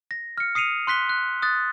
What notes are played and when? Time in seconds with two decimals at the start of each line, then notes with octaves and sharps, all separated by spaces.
0.11 A#6
0.37 F6 C#7
0.55 D#6 C7 C#7 D#7 F7
0.87 C6 F#6 B6 G7
1.09 F#6
1.42 D#6 F#6 A6